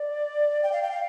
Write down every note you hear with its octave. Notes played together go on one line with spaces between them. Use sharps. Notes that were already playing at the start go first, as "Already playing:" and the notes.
Already playing: D5
G5
F5
G5
F5